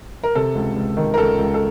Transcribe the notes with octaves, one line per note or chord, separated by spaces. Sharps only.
A#4
C3 A4
C#2
C#2
D#3
A#4
C#2 A4
C#2
A4